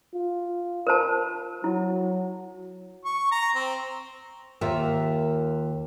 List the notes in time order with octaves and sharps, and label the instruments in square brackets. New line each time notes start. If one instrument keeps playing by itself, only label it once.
[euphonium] F4
[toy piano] A#4 C5 A5
[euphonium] F#3 [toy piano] E4
[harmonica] C#6
A#5
C4
[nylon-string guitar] D#2 F4 A#4 E5